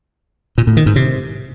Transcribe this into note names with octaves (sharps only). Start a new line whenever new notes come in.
A#2
A2
D#3
G#2
C3